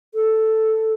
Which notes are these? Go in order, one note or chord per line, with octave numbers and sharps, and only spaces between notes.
A4